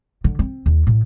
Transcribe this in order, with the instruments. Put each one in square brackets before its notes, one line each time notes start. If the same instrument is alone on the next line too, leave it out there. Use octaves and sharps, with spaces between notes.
[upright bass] D3
C4
D#2
A2